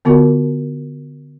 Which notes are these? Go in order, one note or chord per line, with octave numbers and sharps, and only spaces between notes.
D3 B3 F4 F#4 A#4